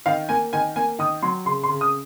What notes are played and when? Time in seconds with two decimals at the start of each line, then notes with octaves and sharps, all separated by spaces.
0.06 D#3 F5
0.29 A#3 G#5
0.53 D#3 G#5
0.76 A#3 G#5
0.99 D#3 D#6
1.22 F#3 C6
1.45 C#3 C6
1.64 C6
1.70 C#3
1.81 D#6